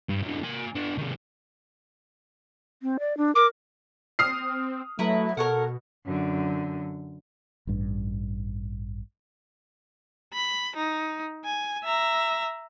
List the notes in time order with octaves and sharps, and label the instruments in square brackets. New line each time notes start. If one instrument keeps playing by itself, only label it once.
[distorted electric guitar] G2
F#2 D3
A#3 G#5
B3 D4
C3 D#3
[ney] C4
D5
D4
[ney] A#4 [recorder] D6
[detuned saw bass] C4 [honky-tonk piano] D#6 F6 C7
[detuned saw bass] F#3 [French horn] A3 [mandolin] E4 B4 A#5
[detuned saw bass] B2 [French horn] A4 [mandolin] A#4 C#5 F#5
[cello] F#2 D3
[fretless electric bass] A1 G2
[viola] B5
D#4
G#5
E5 A#5